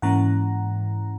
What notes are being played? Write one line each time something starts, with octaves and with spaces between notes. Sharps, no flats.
G#2 E3 A#3 C#4 E4 F#5 A#5